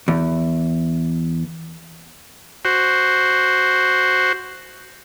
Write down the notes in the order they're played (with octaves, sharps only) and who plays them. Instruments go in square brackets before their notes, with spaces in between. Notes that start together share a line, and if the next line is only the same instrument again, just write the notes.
[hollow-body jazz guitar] E2
[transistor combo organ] F#4 C5